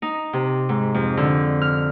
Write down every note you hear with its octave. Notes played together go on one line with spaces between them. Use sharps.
D#4
C3
G#2
F2
D3
F6